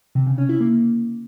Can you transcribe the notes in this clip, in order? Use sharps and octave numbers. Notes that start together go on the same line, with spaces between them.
C3
C#3
C#4
E4
A#3